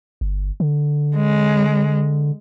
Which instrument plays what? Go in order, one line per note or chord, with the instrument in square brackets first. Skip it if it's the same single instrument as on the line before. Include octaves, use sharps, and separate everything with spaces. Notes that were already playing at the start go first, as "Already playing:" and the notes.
[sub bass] G1
D3
[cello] G#3